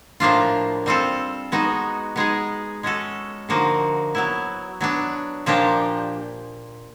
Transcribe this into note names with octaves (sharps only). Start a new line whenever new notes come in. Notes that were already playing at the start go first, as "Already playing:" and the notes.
A2 F3 A#3 D4 F4
G3 C4 F4 A4
G#3 B3 D#4 F#4
G#3 B3 D#4 G#4
G#3 C#4 F#4 A4
D3 F3 A#3 D#4 F#4
F#3 B3 E4
F#3 B3 D4
A#2 F3 A#3 D4 G4